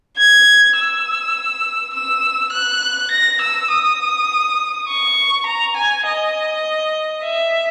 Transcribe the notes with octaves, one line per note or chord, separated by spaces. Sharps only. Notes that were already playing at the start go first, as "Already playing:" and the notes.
G#6
E6
E6
F#6
A#6
E6
D#6
C#6
A#5
G#5
D#5
E5